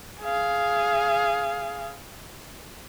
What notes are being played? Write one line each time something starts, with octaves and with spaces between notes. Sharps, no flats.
G#4 F5